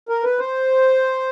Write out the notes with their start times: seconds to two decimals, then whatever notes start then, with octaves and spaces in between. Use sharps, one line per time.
0.09 A#4
0.24 B4
0.39 C5